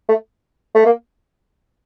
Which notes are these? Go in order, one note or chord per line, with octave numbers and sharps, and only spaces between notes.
A3
A3
A#3